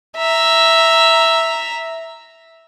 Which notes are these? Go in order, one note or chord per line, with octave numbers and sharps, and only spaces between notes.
E5 A#5